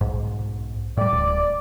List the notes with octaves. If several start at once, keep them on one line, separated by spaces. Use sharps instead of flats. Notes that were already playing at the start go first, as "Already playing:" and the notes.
B1 G#2
A2 G3 D5
D1